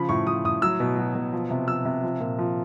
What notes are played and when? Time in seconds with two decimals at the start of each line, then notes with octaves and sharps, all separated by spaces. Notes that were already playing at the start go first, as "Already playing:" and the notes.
Already playing: C#3 F3 B5
0.09 A2 C#6
0.26 F3 D#6
0.45 A2 D#6
0.62 F#3 E6
0.80 B2
0.97 F#3
1.15 B2
1.33 F3
1.50 C3
1.68 F3 E6
1.85 C3
2.03 F3
2.20 A#2
2.39 F3